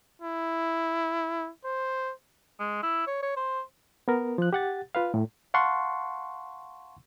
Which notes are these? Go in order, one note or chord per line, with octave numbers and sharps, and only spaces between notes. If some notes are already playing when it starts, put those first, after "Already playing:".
E4
C5
G#3
E4
C#5
C#5
C5
B3 A#4
F3 F#6
G4 F#5 A6
F4 B4 F5
A2
F5 F#5 A5 C6 C#6